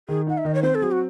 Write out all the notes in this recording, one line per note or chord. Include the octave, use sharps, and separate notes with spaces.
D#3 G#4
D#4 F#5
E5
D#3 D#5
C#5
C4 C5
A4
F#3 G#4
F#4